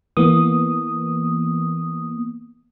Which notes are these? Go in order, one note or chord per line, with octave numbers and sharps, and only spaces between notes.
E3 A#3 B3 D#6